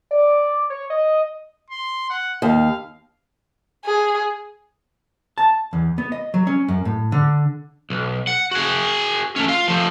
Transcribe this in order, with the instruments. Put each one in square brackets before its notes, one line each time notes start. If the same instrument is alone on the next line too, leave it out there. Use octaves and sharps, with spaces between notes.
[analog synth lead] D5
C#5
D#5
[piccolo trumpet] C6
F#5
[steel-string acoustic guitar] D#2 [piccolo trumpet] F5
[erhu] G#4
[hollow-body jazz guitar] A5
E2
B3
D#5
F#3
C#4
F#2
A2
D3
[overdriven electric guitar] B1
F#5
F#4 G#4
A3 C#4
F4 F5
F3 A3